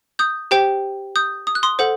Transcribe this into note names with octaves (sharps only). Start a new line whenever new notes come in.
D#6 G6
G4 C5 G5
D#6 G6
D#6
F#6
C6 D#6
A4 C5 F#5